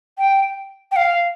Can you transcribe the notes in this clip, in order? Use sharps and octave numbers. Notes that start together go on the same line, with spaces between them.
G5
G5
F5